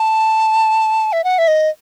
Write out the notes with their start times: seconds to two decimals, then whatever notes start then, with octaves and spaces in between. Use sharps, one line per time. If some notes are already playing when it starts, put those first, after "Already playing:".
Already playing: A5
1.13 E5
1.24 F#5
1.39 E5
1.48 D#5